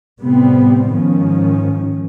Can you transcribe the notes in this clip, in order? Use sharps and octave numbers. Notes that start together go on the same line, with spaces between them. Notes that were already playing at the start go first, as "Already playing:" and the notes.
A2 C3 G3 B3 C4
G#2 D#3 F3 C#4